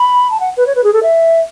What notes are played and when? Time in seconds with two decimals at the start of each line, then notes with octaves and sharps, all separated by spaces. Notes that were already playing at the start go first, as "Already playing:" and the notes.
Already playing: B5
0.31 A5
0.40 F#5
0.57 B4
0.67 C#5
0.75 B4
0.84 G#4
0.93 A4
1.03 E5